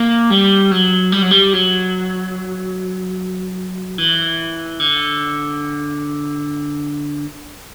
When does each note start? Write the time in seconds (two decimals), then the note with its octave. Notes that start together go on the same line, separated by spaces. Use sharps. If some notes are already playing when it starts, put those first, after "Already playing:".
Already playing: A#3
0.30 G3
0.71 F#3
1.12 G3
1.22 F#3
1.31 G3
1.53 F#3
3.98 E3
4.80 D3